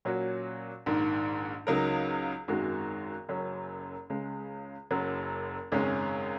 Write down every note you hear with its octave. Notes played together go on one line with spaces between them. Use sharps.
A#2 F#3 C#4 F#4
A#1 G#2 D#3
C#2 C#3 F#3 D#4 A#4
G#1 F#2 D#3 G#3 F#4
F#1 F#2 F#3 C#4
C#2 C#3 G#3
F#1 F#2 F#3
G#1 F#2 C#3 G#3 C#4